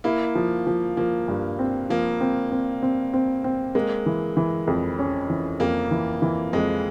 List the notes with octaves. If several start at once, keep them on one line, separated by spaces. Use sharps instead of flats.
A#3 E4
F3
F3
F3 A#3
G2
C4
F3 A#3
C4
C4
C4
C4
C4
G#3 A#3
E3
E3
F2
C#4
E3
F2 A#3
E3
E3
F2 G#3